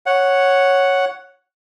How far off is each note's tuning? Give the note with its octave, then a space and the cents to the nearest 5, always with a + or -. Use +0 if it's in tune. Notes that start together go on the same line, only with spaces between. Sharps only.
C#5 +0 F#5 +0